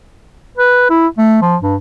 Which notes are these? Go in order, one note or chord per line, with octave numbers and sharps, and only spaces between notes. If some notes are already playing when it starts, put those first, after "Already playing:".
B4
E4
A3
F3
G2